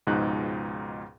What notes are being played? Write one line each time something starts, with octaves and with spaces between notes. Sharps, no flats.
C#2 G#2 B2 F3 D#4 F#6